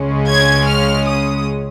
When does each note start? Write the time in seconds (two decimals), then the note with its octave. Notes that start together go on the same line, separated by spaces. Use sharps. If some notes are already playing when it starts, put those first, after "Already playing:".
Already playing: C#2 C#3 G#3 C#4
0.28 G#6
0.67 F6
1.06 D#6